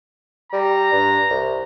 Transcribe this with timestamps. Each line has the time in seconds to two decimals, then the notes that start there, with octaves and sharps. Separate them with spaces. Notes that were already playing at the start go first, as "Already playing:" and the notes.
0.52 G3 A#5
0.92 G2
1.30 C2